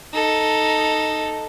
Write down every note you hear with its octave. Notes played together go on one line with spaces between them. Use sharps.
D#4 A4